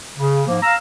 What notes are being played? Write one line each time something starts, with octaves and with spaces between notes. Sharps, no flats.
C#3
G#2 F3 A#3
F5 A#5 E6